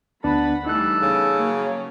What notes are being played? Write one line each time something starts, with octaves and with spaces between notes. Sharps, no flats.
D2 B3 D4 B4 F#5 A5 B5
E3 G3 A3 D#4 A4 F#6
C#3 B3
F#3 A#3 C#5